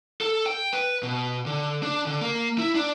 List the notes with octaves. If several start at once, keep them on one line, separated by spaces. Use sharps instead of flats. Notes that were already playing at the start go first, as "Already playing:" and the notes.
A4
G5
B4
B2
D3
D4
D3
A#3
E4
D4